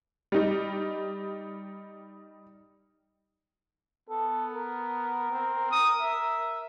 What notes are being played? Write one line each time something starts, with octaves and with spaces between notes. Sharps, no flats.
G3 D#4
B3 A4
A#4
C4
D#6
E5